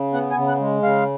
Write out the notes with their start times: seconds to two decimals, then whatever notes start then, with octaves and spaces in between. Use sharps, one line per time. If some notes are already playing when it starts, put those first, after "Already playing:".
Already playing: C#3
0.13 B3 F#5
0.30 G#5
0.36 C#3
0.48 F#5
0.60 G#3
0.82 C#3 F5